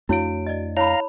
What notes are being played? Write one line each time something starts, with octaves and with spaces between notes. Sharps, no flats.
F2 A3 D4 E4 F#4 C#5 F5 D7
D5 D#5
E4 C#5 F5 A#5 B5